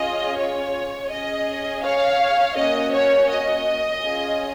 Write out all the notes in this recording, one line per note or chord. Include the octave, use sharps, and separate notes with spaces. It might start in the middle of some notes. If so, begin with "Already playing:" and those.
Already playing: C#4 F4 G#4 D#5
C#5
C#4 G#4 D#5
C#5 F5
A#3 C#4 F#4 D#5
C#5
D#5
C#4 F4 G#4